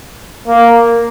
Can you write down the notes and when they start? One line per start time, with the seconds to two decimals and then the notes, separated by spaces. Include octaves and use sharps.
0.48 A#3